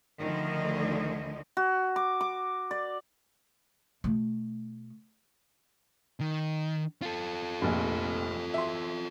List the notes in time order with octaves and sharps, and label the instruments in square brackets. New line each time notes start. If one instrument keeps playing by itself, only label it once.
[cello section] D2 D3 D#3 F3 D#5
[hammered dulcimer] F#4
D6
D6
D5
[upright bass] B2 A3
[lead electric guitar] D#3
F4 A4
[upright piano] F1 A#1
E5 C6